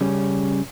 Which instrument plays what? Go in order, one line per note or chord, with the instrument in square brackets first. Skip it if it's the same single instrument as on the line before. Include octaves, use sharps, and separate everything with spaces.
[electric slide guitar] C#3 G3 C#4